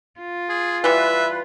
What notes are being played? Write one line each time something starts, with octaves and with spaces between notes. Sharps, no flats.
F4
G#4
E3 G3 B4 E5